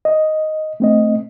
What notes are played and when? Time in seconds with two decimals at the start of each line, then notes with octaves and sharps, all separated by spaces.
0.05 D#5
0.80 A3 C4 D#5